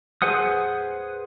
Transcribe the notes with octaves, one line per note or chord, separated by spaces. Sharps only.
G#4 B4 C5 F#5 D#6